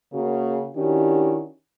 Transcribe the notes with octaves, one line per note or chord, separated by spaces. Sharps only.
C#3 A#3 F#4
D#3 C#4 D4 E4 F#4 G4